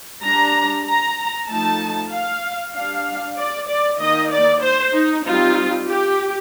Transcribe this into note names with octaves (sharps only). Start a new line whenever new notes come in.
G3 D4 A#5
A#5
F3 A3 D#4 A5
F5
G3 D4 F5
D5
D5
D#3 A#3 D#4 D#5
D5
C5
D#4
G3 C4 D#4 F4
G4